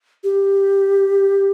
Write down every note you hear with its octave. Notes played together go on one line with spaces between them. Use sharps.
G4